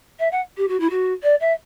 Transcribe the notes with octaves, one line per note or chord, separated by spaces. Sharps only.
E5
F#5
G4
F#4
E4
F#4
D5
E5